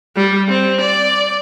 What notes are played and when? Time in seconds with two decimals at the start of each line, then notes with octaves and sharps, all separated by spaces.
0.16 G3
0.48 C4
0.81 D5